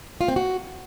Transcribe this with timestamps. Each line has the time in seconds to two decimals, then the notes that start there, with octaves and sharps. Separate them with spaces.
0.21 F4
0.28 C4
0.36 F#4